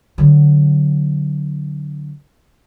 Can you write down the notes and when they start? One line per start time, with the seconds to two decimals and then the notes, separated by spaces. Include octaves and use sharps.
0.18 D3 F#3